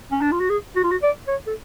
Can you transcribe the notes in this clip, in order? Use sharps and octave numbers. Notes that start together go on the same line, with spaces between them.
C#4
D4
F4
F#4
G#4
F#4
F4
F#4
D5
C#5
A4